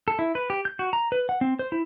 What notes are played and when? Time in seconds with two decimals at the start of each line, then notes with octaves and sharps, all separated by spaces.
0.08 A4
0.19 E4
0.35 B4
0.50 G4
0.65 G6
0.79 F#4
0.93 A#5
1.12 B4
1.29 F#5
1.41 C4
1.59 C5
1.72 E4